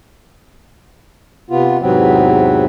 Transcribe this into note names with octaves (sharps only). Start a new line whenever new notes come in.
C3 B3 F4
E2 G#2 C3 F#3 B3 C4